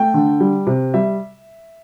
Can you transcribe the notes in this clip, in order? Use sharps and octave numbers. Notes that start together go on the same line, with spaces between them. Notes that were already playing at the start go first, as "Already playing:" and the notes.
Already playing: A3 G5
D3
G3
C3
G3 E5